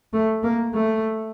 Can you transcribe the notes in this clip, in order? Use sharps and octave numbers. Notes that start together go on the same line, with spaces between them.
A3
A#3
A3